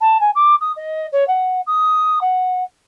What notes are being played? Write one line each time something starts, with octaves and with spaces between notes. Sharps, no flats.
A5
G#5
D6
D#6
D#5
C#5
F#5
D#6
F#5